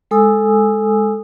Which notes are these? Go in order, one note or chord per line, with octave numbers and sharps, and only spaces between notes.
G#3 A4 G#5 D#6 E6